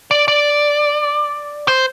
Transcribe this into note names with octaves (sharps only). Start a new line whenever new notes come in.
D5
D5
C5